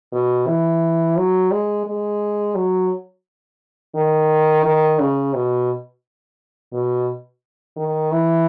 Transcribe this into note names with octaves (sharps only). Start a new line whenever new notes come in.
B2
E3
F#3
G#3
G#3
F#3
D#3
D#3
C#3
B2
B2
D#3
E3